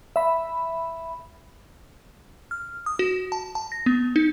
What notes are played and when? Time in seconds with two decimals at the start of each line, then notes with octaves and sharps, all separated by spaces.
0.16 E5 B5
2.51 F6
2.86 D#6
2.99 F#4
3.32 A5
3.55 A5
3.72 A#6
3.86 B3
4.16 D#4